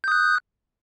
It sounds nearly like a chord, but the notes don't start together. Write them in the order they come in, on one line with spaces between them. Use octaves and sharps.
G6 D#6 F#6